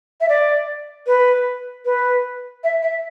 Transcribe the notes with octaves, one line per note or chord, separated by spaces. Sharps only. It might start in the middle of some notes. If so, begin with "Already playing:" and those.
E5
D5
B4
B4
E5
E5